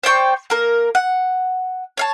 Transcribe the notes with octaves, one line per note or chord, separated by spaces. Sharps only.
C5 D5 G5 C#6
A#3 A#4
F#5
C#5 F5 A5